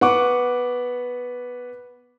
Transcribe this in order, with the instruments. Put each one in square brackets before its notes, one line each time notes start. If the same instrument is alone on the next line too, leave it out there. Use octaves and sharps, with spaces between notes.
[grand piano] B3 F#5 C#6 D6